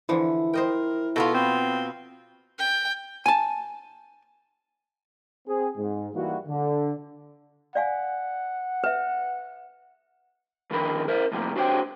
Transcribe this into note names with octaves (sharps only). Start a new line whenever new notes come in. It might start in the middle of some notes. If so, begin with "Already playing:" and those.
D3 E3 F3 E4
A#4 C5 D#5 G5
B2 B3 F4 A4
C4
G5
G#5 A5
C4 G#4
G#2 G#3
E3 G3 A#3 D#4 E4 F#4
D3
D5 F5 F#5 G#5
B4 E5
D#2 D3 D#3 F3 A#4 B5
A#4 C5 E5
A2 C3 F3 G3 A#3
D4 F#4 G4 C5 C#5 G5